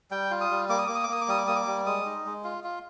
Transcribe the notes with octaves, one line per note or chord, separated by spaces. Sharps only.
G3 G5
F4
D#6
G3
A#3 D6
D#6
A#3 D6
D#6
D6
A#3 D#6
D6
G3 D#6
D6
A#3 D#6
D6
G3
G#3 D#6
D#4
G#3
F4
F4